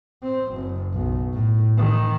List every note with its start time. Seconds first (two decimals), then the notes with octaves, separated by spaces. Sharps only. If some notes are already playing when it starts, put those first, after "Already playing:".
0.23 C4
0.53 F#1
0.93 B1
1.33 A2
1.77 D#3